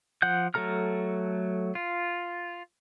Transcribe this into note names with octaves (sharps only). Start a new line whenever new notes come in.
F3 F#5 F#6 G6
F#3 A3 A4 A#5 F6
F4